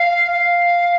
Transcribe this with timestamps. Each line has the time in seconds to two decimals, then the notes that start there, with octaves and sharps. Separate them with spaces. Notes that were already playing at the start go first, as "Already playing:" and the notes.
Already playing: F5
0.32 F5